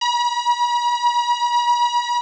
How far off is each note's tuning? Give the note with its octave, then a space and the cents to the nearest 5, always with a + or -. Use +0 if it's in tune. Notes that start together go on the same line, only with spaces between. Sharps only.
B5 -45